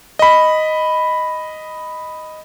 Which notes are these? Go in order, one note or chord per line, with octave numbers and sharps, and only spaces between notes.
D#5 B5